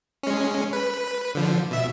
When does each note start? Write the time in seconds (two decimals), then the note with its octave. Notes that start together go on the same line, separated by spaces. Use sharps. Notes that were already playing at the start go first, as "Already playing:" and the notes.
0.23 G#3 C#4
0.73 B4
1.35 D3 F3
1.71 B2 E5